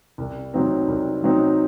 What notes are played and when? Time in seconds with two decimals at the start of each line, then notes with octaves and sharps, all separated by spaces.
0.18 C2
0.54 C3 F#3 C4 D#4
0.88 C2
1.22 C3 F#3 C4 D#4